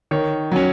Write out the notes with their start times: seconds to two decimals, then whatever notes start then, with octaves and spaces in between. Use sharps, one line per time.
0.11 D#3 C#5
0.52 F#3 C#4